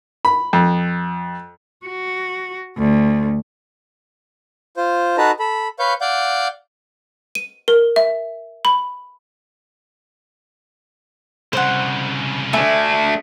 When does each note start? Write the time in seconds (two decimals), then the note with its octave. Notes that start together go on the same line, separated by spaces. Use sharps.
0.25 B5
0.53 F2
1.86 F#4
2.77 D2
4.77 F4 C5
5.18 D#4 F#4 A4 B4 A5 A#5
5.39 A4 B5
5.79 B4 C#5 F5 G6
6.01 D5 F5 F#5 G6
7.35 D#7
7.68 A#4
7.96 E5
8.65 B5
11.53 C2 C#3 C5 F#5
12.53 A3 D4 E5 G#5